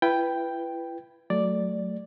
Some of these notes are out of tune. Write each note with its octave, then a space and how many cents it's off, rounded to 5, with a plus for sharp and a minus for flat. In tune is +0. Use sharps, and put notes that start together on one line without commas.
E4 +40 B4 +0 G5 +0
F#3 +0 A3 -5 D5 +0